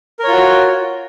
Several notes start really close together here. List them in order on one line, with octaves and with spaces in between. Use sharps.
A#4 C#5 F4 F#4